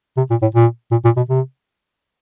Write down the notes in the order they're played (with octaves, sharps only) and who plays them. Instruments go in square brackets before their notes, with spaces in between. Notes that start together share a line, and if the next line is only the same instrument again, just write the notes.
[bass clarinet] C3
A#2
A2
A#2
A#2
A#2
B2
C3